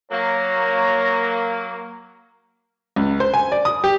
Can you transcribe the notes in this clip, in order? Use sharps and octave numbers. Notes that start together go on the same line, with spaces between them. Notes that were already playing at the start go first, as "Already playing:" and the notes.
F#3 A#3 C#5 A#5
C#2
C5
G#5
D5
D#6
G4